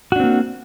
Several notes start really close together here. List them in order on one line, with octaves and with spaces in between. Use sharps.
F#4 D4 C4 A#3